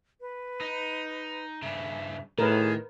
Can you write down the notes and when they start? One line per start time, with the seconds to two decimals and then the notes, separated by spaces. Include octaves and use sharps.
0.21 B4
0.61 D#4
1.62 G2 C#3 E5
2.39 A2 D#3 G#4 A#4 B4